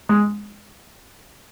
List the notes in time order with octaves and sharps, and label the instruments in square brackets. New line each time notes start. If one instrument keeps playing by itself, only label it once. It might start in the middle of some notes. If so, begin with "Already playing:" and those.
[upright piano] G#3